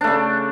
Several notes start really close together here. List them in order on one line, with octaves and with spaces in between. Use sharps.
D4 A3 C#3